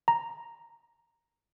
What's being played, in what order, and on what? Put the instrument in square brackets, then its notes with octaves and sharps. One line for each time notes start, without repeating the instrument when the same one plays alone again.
[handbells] A#5